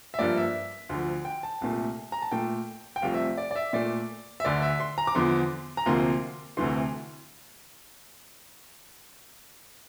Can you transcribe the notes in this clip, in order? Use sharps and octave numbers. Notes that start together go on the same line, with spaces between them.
E5
G2 F3 A#3 D5
E5
D2 D3 F3
G5
A5
C2 A#2 A3
A#5
A5
A#2 A3 G5
G5
C2 C3 F3 A3 F5
E5
D5
D5
E5
A#2 A3 D5
E5
D2 D3 A3 D5
E5
C6
A#5
D6
E2 D3 F3 C6
A#5
D2 C3 F3 A#3 C6
D2 C3 E3 A3 C6